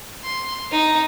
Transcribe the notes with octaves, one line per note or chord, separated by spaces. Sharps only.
C6
D#4